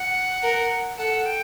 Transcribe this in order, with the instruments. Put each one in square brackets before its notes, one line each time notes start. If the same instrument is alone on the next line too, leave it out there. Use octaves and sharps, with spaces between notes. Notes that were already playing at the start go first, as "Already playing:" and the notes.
Already playing: [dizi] F#5
[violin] A#4
[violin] A4 [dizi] F#5
[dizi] G5